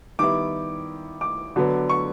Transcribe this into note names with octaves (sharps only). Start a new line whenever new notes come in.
D#3 G3 B3 E4 D6
D6
D3 F#3 B3
C#6